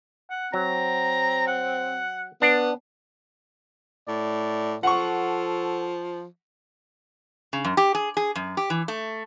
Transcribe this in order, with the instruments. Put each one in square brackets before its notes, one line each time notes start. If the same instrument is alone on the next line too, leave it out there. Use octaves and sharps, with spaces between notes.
[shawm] F#5
[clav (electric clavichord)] F#3 [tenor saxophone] C4 [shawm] A#5
[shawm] F#5
[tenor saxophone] B3 [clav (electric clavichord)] D4
[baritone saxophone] A2 [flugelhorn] D5
[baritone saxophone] F3 [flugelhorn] A4 [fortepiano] F#5 C#6
[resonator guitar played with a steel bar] C#3
F#2
G4
G#4
G#4
F#2
G4
E3
A3